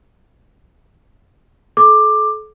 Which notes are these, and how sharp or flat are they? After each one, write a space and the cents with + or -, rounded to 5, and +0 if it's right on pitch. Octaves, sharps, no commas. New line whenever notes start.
A4 -40 D6 +10